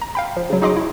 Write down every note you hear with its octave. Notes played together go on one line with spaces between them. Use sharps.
A#5
F5 G5 B5
F3
C#3 F#3
D#4 F#4 G#4 D#5 C6 D6
E4